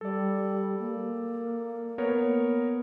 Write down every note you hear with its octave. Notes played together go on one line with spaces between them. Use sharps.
G3 A4 D5
A#3
B3 A#4 C#5